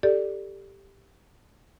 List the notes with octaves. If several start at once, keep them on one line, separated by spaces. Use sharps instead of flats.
G4 A4 D5